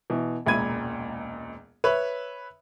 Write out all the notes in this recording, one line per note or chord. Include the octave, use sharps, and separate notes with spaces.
B2 E3
E1 C#2 A#2 B5 G#6 D#7
B4 C#5 E5 B5